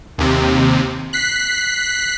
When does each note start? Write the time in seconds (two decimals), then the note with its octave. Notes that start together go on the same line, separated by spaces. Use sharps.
0.18 D#2 C3
1.13 F#6 B6 C7